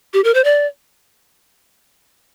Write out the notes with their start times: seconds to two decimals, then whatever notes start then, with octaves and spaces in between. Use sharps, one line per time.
0.14 G4
0.24 A#4
0.34 C5
0.44 D5